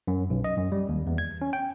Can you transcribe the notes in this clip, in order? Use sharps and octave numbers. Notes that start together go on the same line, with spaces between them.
F#2
B1
D#5
F#2
G3
D#2
E2
G#6
C#4
G5